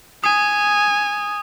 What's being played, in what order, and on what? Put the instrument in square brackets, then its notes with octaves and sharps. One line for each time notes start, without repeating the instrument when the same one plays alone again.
[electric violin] G#5 [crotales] D#6